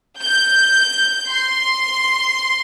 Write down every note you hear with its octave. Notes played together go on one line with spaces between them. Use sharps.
G6
C6